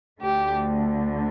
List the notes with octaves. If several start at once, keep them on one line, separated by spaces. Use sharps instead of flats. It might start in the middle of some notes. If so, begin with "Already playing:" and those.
D2 D3 A3 G4